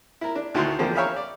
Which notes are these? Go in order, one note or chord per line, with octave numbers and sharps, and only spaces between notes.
E4 A#4
D4
D2 D#3 E4 F#4 C6
E2 D3 F3 A#3 C4
A#4 C#5 E5 F5 G5 B5
D5